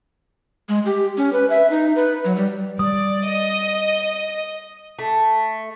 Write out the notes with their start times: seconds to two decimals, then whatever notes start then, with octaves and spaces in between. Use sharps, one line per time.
0.69 G#3
0.86 G4
1.17 C#4
1.33 B4
1.50 E5
1.70 D#4
1.96 B4
2.25 F#3
2.36 G3
2.79 G3 D5 D#6
3.26 D#5
4.99 A3